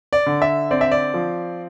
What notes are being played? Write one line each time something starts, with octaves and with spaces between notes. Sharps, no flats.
D5
D3
E5
C4 D5
E5
D5
F3